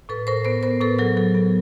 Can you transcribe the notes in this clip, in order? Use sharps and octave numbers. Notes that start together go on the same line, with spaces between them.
A2 A4 B4
A2 A#4 C5
B3 A#4 C5
B3 A#4 C5
A2 A4 B4
F#3 G#4 A#4
F#3 A4
B3